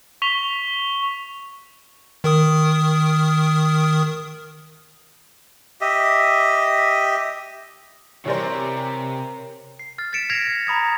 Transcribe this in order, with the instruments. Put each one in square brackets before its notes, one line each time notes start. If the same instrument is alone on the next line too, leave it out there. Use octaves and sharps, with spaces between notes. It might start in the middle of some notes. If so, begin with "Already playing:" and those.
[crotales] C#6 B6 F7 G7
[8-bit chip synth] D#3 A#4 D#6
[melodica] G4 D#5 E5
[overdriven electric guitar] C3 [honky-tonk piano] E3 G3 C5 [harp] A#4 C#5
[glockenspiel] C7
F6 A6
F6 A6 B6 C#7 D7 E7
F6 G#6 A#6 C7 C#7 F7
A6
A#5 B5 D#6 G#6